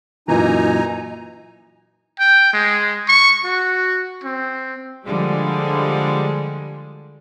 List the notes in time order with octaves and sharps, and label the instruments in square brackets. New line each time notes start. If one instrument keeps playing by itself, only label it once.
[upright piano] F#2 A#2 E3 [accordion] D#4 G#5 A#5
[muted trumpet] G5
G#3
C#6
F#4
C4
[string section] D3 F3 G3 G#3